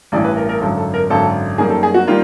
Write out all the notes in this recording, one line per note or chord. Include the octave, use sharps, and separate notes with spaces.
A1 G2 E3 D5
B4
A#4
A#4
G#1 F#2 D3 A4
A4
A#4
G#1 F#2 D3 A4
F#2 D#3 G3 A#3 G#4
A4
G#4
F#4
D#3 G3 A#3 F4